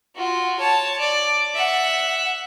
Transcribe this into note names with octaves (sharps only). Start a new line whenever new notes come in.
F4 F#4
C#5 A5
D5
E5 F#5